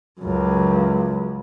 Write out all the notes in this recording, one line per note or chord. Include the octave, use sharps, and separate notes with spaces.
C#2 F#2